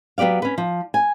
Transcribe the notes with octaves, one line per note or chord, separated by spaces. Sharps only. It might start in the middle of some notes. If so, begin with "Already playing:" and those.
F#3 B3 G4 D5 F5
C#4 B4
F3
G#5